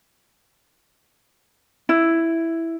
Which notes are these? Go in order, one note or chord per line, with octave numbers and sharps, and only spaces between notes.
E4